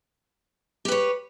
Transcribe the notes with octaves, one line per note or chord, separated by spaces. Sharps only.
G4 B4 C#5